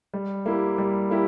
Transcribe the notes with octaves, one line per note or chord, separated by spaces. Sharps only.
G3
A#3 E4 G4
G3
A#3 E4 G4